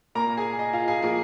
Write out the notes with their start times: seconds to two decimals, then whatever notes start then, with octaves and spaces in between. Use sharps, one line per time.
0.15 A#2 A#4 A#5
0.19 A#3
0.37 G#4 G#5
0.59 D#5
0.73 F4 F5
0.88 G#4 G#5
1.02 F3 A#3 G#4 G#5